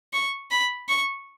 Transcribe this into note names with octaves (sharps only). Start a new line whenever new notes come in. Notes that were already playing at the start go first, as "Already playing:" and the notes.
C#6
B5
C#6